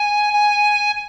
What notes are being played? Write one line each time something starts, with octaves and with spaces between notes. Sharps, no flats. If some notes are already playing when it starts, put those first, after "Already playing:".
Already playing: G#5
G#5